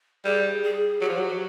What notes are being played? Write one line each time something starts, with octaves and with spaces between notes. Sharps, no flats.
G3 G#4
G#4
F#3 G4
F3
F#3